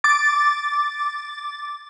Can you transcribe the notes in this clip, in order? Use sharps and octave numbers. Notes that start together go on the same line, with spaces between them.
D6 A6